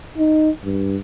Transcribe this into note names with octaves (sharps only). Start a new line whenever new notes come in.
D#4
G2